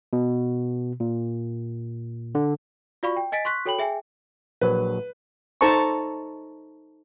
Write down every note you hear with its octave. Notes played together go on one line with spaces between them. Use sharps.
B2
A#2
D3
F4 F#4 D5 F5 B5 C#6
G5
D#5 G#5 A6 B6 D7
C6 C#6 F#6 B6
F#4 A4 C#5 G5 B5 F#7
G#4 E5 G5 G#5
A#1 F#3 B4
D#4 A4 C5 A5 A#5 C#6